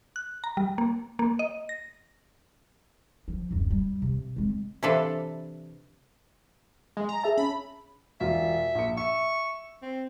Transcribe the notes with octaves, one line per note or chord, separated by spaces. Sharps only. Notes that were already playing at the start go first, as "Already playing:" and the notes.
F#6
A#5
G3
A#3
A#3
D#5
A#6
F3
D1 F#2
G3
C3
G#3 C4
C3 E3 D4 A4 B4 F5
G#3
A#5
G#4 E5 A5
C#4 B5
E1 F4 E5
A#1 C#7
E5 C#6
C4